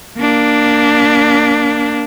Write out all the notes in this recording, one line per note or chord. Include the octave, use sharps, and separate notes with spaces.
A#3 D4